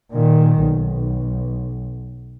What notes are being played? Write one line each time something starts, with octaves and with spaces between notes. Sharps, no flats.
A#2 D#3
B1